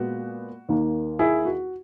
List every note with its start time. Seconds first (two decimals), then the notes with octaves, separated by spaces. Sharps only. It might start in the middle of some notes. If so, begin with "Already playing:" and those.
Already playing: A#2 G#3 B3 F#4
0.69 D#2 D#3 A#3
1.19 E4 G#4
1.45 F#4